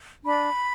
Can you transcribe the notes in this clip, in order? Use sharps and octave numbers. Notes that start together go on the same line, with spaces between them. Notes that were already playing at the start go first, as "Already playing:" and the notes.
D4 B5